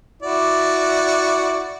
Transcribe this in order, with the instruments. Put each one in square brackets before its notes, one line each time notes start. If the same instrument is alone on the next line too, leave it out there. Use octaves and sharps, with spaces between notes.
[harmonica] E4 F#4 D5